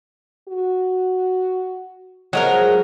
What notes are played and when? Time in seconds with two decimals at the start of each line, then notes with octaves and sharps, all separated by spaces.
0.48 F#4
2.33 F3 F#3 G#3 A#4